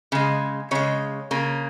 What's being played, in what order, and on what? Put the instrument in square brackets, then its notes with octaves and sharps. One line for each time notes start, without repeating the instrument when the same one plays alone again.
[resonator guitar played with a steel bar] C#3 G#3
C#3 G#3 C#5
C#3 A#3